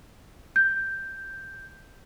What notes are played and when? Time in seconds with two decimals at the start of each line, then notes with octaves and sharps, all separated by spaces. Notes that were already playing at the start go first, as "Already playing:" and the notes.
0.56 G6